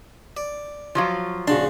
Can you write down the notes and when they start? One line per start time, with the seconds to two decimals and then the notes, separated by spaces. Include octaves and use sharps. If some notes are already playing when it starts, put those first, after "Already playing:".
0.37 D5
0.95 F3 F#3 F4
1.47 A#1 C#3 D4 F#4 C6